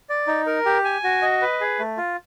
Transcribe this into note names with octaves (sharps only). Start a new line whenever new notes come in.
D5
D#4
A#4
G4
G#5
F#4
D#5
B4
G#4
A3
F4